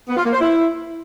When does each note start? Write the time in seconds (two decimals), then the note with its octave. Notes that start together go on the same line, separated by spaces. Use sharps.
0.09 B3
0.17 F4
0.25 A#3
0.33 C5
0.41 E4